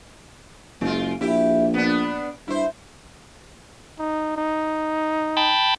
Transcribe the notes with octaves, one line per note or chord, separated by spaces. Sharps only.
F#1 G#3 F4
A#1 E4 G4
B3 D4
G2 E4 C5
D#4
D#4
G5 A5 B5